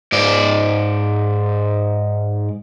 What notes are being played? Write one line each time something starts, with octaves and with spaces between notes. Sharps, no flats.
G#2 D5